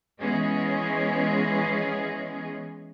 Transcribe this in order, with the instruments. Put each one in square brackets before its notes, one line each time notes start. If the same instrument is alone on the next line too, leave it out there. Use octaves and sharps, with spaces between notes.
[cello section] E3 G#3 B3 C#4 G#4 D#5